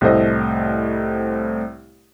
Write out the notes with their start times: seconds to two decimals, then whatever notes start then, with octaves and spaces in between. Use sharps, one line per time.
0.01 C2 A2 A3 C5 D#5